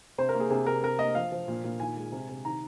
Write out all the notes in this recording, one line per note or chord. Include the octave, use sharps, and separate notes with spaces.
C3 C5
A#4
A#3
G#4
C3 G#4
C3 A#4
C3 A#4
A#3 D#5
F3 F5
F3
A#2
A#2
D#3 G#5
G#3
C3
C3
D#3 A#5